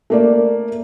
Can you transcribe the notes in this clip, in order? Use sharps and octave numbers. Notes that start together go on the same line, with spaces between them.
A3 A#3 D5